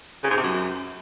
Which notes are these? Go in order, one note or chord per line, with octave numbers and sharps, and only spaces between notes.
C#3
G#2
C3
F#2